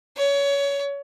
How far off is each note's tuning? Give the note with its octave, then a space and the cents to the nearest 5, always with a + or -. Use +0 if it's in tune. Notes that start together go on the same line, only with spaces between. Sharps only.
C#5 +25